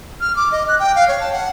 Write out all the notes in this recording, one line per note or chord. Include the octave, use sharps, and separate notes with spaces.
F6
D6
D#5
F#6
G5
F5
C#5
A5
F#5